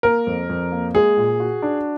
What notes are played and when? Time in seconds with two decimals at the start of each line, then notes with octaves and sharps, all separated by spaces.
0.03 A#3 A#4
0.27 F2
0.49 F2
0.72 A#3
0.95 G#3 G#4
1.17 A#2
1.40 F#4
1.62 D4